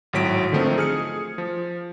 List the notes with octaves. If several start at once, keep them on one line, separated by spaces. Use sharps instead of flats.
G#1 A2 F#3 B6 D7
D3 D#3 F3 A3 C4 D#4
G#4 F6 C#7
F3